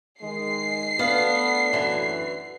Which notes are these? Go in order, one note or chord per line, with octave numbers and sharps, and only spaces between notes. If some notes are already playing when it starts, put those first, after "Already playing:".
D#3 G#3 C7
A3 B3 D4 F#4 F5
F#2 E3